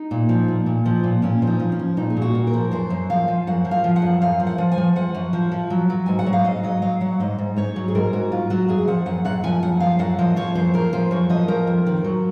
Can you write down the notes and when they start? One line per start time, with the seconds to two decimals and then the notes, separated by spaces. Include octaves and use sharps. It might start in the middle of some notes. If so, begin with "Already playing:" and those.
Already playing: D#4
0.11 A#2
0.29 F3
0.48 A#2
0.66 A#2
0.86 F3
1.04 A#2
1.22 A#2 C#4
1.42 F3
1.47 D#4
1.60 F3
1.72 C#4
1.79 F3
1.97 A#2 D#4
2.10 G#4
2.17 A#2
2.22 F#4
2.35 A#2
2.47 A#4
2.54 F3
2.71 F#2 C5
2.90 F#2
3.10 F3 F5
3.28 F3
3.47 F#2 F#5
3.65 F3
3.71 F5
3.84 F3
3.96 F#5
4.02 F#2
4.21 F#2 F5
4.40 F3
4.47 F#5
4.58 F3
4.72 G#5
4.78 F3
4.96 F3 F#5
5.15 F#2
5.33 F3
5.52 F3
5.70 F#3
5.90 F#3
6.06 G#2 G#5
6.19 F#5
6.27 F#3
6.33 F5
6.44 G#2 D#5
6.63 F#3 D#5
6.82 F#3 F5
7.01 F#3 F#5
7.20 G#2 D#5
7.38 G#2
7.56 G#2 C#5
7.76 F#3
7.88 G#4
7.95 G#2 A#4
8.13 G#2 F#4
8.32 F#3 F4
8.50 F#3 F#4
8.68 F#2 G#4
8.87 F3 F#5
9.06 F#2 F#5
9.25 F#2 F#5
9.44 F3 G#5
9.62 F#2 F#5
9.80 F3 F5
9.99 F#2 F#5
10.18 F3 D#5
10.36 F3 C#5
10.55 F#2 C5
10.74 F3 A#4
10.93 F3 C5
11.11 F#2 C#5
11.29 F3 D#5
11.48 F3 A#4
11.67 F2
11.87 D#3
12.04 F#3